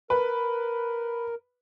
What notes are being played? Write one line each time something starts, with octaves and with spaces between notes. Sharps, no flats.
A#4 B4